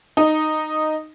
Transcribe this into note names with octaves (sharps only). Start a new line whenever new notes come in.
D#4